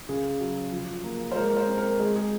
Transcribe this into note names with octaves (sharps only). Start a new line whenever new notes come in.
C#3 G#4
F#3
F3
A#3
C5
G#3 A#4
C5
C4
A#4
G#3 G#4
G#4